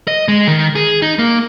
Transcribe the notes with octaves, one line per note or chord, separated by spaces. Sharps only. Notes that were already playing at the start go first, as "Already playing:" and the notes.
D#5
G#3
D#3
G#4
D#4
A#3